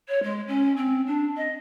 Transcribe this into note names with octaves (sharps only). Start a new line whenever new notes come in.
C#5
G#3
C#4
C4
D4
D#5